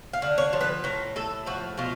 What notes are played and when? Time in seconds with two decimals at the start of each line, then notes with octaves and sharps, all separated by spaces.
0.13 F5
0.22 D3
0.38 C#5
0.53 F3
0.61 B4
0.84 A2 A#4
1.16 A2 A4
1.46 F3 F#4
1.78 B2 F4